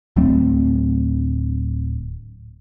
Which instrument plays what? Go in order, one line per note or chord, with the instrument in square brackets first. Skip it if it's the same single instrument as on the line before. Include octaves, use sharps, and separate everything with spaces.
[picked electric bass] D1 F#3 A3 C4